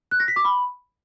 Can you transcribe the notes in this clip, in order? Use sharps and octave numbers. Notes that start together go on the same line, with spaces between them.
F#6
A#6
B6
D6
B5